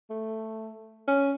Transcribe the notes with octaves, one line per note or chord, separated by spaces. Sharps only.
A3
C#4